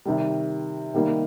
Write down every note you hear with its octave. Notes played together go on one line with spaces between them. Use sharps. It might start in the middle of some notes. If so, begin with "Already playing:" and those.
C3 D#3 G3
C3 D#3 G3 A#3 D#4